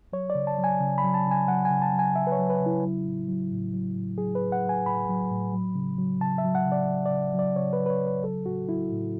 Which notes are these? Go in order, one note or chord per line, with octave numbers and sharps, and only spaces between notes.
F#3 C#5
D5
C#3
A5
F#3
G#5
C#3
B5
F#3
A5
C#3
G#5
F#3 F#5
G#5
C#3
A5
F#3
G#5
C#3 E5
B4
C#5
F#3
B4
C#3
E4
F#3
A2
F#3
A2
F#3
A2
F#3 G#4
B4
A2
F#5
F#3
G#5
A2 B5
F#3
A2
F#3
C#3
F#3
C#3 A5
E5
F#3
F#5
C#3
D5
F#3
C#3 D5
F#3
D5
C#3 C#5
B4
F#3
B4
C#5
C#3
B4
F#3 A4
A2 F#4
F#3 E4
A2